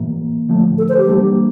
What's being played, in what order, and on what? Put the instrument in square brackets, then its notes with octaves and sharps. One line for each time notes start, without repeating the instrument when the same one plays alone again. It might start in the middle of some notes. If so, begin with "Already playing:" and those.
Already playing: [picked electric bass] A2 E3 A#3
D3 F3 A3
[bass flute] A4
C5
G4
[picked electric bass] E3 G3 A#3 D4